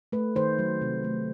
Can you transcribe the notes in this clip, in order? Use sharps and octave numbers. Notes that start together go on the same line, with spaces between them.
A3 B4
D#3 C5
F#3
C3
A3